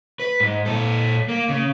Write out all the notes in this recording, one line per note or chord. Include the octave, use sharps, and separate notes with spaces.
B4
G#2
A#2 A4
A#3
C#3